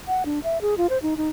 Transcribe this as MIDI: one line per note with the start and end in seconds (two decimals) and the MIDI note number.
0.08 0.23 78
0.25 0.39 62
0.44 0.58 76
0.61 0.74 68
0.77 0.87 65
0.90 0.98 72
1.02 1.14 63
1.17 1.29 63